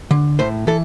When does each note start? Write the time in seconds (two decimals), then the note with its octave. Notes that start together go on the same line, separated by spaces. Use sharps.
0.11 D3
0.39 A2 C5
0.67 E3 A4